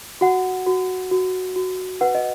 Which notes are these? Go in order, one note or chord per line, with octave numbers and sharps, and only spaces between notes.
F#4 F#5
F#4
F#4
F#4
B4 F#5
D#5